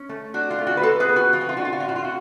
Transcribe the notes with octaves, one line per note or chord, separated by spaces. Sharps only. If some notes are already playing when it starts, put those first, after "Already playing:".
Already playing: C#4
A3
D4 F#4
F4
A3
F#4
B4
F4 F#4 A4
G#4 B4
B3
F#4
F3 F4
F#4
F4
D4 F#4
F4
F#4
A2 F4
F#4
F4
F#4